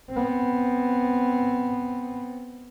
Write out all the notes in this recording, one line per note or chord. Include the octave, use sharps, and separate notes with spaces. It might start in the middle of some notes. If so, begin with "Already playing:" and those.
B3 C4